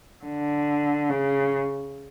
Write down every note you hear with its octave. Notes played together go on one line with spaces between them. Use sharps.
D3
C#3